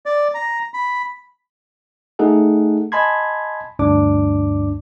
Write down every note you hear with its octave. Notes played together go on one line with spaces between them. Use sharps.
D5
A#5
B5
A3 D#4 G#4 A4 F#5
D#5 G#5 A5 B5 C6 G#6
D2 G2 D4 D6